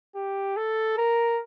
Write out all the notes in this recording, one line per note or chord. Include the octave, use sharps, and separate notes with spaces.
G4
A4
A#4